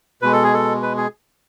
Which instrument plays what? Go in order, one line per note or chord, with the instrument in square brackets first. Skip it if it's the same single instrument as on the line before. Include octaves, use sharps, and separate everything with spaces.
[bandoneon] B2 G#3 B4
A4
G#4
A4
B4
G#4